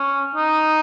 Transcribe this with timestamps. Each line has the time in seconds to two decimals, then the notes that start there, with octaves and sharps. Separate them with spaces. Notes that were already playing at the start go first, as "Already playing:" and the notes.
Already playing: C#4
0.35 D#4